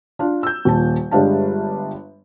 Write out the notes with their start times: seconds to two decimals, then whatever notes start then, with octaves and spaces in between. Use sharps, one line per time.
0.19 D4 F4
0.43 E6 G6
0.65 D#1 A#2 A5
1.11 G1 G3 G#3 D4 F5 A5